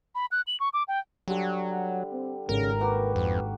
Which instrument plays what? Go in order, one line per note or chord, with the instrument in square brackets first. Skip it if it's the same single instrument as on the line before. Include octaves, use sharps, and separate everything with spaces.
[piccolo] B5
F#6
F#7
C#6
D6
G5
[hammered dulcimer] D3 G3 [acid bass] F#3 [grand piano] G4
[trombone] C4
[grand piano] G#1 [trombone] C#3 [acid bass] A#4
[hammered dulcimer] A#3 F#4 G4 [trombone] B4
[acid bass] F2